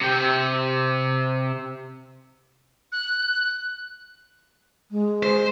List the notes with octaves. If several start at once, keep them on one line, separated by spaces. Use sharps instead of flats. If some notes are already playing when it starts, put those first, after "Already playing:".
C3 G5
F#6
G#3
C5